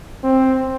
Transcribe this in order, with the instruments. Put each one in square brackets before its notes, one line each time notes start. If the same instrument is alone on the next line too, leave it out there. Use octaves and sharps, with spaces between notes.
[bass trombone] C4